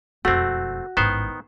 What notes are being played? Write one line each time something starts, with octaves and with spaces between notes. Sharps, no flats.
E1 F2 A3 C4 F#4
A1 G#2 D#3 B3 C5